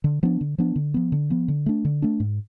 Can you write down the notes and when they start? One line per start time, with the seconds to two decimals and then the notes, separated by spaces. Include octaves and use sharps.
0.04 D3
0.23 F3 B3 D4
0.41 D3
0.58 F3 B3 D4
0.76 D3
0.94 F3 B3
1.12 D3
1.30 F3 B3
1.48 D3
1.66 A3 D4
1.85 D3
2.02 A3 D4
2.20 G#2